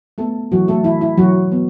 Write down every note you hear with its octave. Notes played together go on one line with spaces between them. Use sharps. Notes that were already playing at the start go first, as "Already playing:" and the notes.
A3 B3 A4
E3 F#3 F#4
A3 A4
E3 E4
E4
E3 F#3 F#4
B3